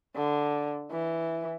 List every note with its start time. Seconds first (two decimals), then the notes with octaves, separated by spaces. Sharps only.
0.16 D3
0.92 E3